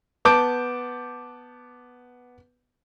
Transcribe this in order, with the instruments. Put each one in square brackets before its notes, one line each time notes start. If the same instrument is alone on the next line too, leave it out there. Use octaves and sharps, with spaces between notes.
[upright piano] B3 A5 D6 G6 D7